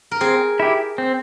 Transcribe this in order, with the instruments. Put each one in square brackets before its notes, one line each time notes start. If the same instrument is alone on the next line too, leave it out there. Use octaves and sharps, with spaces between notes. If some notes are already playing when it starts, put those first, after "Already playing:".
[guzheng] A#4
[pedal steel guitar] C4 [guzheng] G#4
[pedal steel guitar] E4 G4
C4